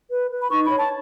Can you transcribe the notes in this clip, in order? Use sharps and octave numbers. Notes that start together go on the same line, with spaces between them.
B4
B4
B5
D#4 C#6
C#5 B5
A5